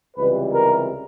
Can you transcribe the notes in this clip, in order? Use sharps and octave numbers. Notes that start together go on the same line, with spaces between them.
C#2 C3 E3 G3 B4
A#4